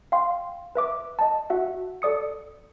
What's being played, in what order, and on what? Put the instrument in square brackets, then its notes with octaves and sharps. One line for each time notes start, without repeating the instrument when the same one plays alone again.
[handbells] F5 G5 C6
B4 E5 D6
D#5 A5
F#4 E5 F#5
A4 D5 D#6 C#7